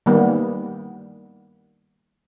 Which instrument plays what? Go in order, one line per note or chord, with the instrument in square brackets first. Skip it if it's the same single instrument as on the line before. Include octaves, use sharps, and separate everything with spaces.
[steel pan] D#3 G3 A#3 B3